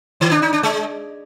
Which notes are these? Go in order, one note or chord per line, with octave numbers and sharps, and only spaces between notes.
D#3
D4
D#4
D4
G#3